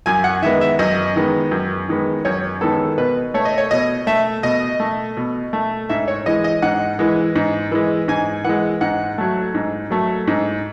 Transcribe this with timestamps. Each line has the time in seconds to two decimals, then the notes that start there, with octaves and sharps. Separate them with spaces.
0.06 F#2 G#5
0.24 F#5
0.43 D#3 G#3 B3 E5
0.61 E5
0.79 F#2 D#5
1.16 D#3 G#3 B3
1.51 F#2
1.89 D#3 G#3 B3
2.25 F#2 C#5
2.61 D#3 G#3 B3 A4
2.98 B2 B4
3.34 A3 C#5
3.45 D#5
3.58 C#5
3.71 B2 D#5
4.07 A3 E5
4.43 B2 D#5
4.80 A3
5.17 B2
5.53 A3
5.89 G#2 E5
6.08 C#5
6.26 E3 G#3 D#5
6.44 D#5
6.62 G#2 F#5
6.99 E3 G#3
7.36 G#2
7.71 E3 G#3
8.08 G#2 G#5
8.44 E3 G#3 F#5
8.81 G#2 F#5
9.18 F#3 A3
9.55 G#2
9.91 F#3 A3
10.28 G#2